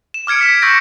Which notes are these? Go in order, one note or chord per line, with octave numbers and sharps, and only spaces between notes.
E7
D6 F6 G#6 C#7 D7
B6 E7
C#6 E6 G6 A#6 D7